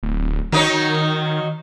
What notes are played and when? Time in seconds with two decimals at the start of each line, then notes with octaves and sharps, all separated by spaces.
0.03 D1
0.52 D#3 F#3 D#4 C#5